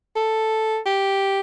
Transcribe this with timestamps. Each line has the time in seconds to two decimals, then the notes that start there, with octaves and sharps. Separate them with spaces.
0.16 A4
0.86 G4